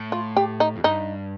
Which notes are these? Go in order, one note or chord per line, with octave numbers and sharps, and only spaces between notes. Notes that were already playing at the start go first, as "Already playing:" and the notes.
Already playing: A2
F4
G4
D#4
F2
G2 D#4